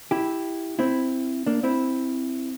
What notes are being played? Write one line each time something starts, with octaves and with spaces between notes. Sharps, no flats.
E4 G4
C4 E4
A#3 D4
C4 E4